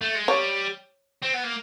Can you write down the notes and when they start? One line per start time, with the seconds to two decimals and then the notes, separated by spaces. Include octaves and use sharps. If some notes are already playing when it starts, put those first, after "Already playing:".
0.01 A3
0.15 G#3
0.28 G3 C#5
1.23 C4
1.34 B3
1.44 A#3